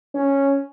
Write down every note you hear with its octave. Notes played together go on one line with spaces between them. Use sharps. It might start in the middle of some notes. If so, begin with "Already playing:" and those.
C#4